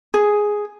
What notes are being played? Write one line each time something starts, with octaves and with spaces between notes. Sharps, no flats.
G#4